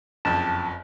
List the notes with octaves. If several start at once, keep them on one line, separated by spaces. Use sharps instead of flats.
F#1 F2 A5